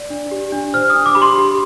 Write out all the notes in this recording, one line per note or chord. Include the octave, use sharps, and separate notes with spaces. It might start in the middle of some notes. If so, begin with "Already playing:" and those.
Already playing: D5
D4
G4
D4
C5 F6
D4 D#6
D6
G4 B5
C6
G4